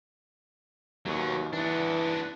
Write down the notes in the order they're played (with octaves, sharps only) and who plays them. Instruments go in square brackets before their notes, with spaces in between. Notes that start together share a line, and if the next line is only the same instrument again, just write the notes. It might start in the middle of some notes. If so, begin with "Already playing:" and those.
[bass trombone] D#2 [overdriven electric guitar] F#3 B3
[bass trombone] E3 [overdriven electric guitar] B3 D4